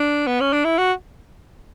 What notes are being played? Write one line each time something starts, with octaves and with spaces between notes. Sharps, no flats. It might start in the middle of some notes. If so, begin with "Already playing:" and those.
Already playing: D4
B3
C#4
D4
E4
F#4